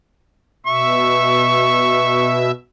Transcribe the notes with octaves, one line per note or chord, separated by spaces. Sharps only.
B2 E5 C#6